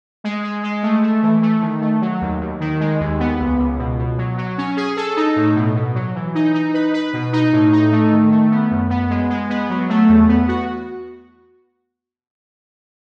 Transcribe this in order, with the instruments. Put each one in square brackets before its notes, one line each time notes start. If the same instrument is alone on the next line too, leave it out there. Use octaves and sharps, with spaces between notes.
[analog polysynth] G#3
G#3
G#3
A3
A3
E3
A3
D#3
A3
F#3
D#2
D#2
D#3
G#3
D#2
B3
C#2
C#2
B2
B2
F#3
F#3
C#4
G#4
A4
D#4
A2
B2
B2
F#3
E3
D#4
D#4
B4
B4
B2
D#4
A2
D#4
A3
D#3
A3
B3
F#2
B3
G#3
G#3
B3
F#3
A3
E2
B3
F#4